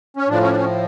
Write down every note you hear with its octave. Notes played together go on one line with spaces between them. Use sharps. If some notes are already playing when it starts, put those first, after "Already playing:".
C#4
A2 F3 D4
C#4
D4
C#4